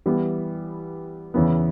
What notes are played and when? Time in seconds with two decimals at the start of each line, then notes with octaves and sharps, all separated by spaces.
0.06 E3 G3 B3
1.34 E2 C#3 E3 B3